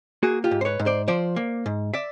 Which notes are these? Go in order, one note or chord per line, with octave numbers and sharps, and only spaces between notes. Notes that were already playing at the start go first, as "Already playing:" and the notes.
A#3 F#4 G#4
F4 G4
G#2
C5
B4 C#5
G#2
C5 D5
F3 C5 D5
A#3
G#2
D5 E5